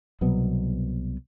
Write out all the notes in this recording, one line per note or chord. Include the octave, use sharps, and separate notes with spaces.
C2 B2 F#3 B3